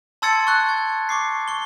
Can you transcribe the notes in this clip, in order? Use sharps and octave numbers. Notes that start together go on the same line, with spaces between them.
A5 C6 E6 G#6 A6 C#7
C#6 F#6
G#6
C#6 D6 C7
C#6 G7